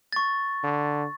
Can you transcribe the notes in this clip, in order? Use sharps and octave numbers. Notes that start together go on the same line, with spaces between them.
C#6 A6
D3